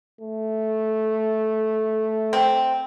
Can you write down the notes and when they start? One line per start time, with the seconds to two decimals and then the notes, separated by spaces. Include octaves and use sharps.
0.21 A3
2.33 C4